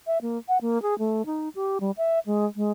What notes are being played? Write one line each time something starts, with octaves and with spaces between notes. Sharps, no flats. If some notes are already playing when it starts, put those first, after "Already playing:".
E5
A#3
F#5
A#3
G#4
A3
D#4
G4
G3
E5
G#3
G#3